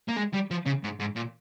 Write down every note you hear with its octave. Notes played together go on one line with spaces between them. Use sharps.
A#3
G#3
G3
F3
C#3
G#2
G#2
A#2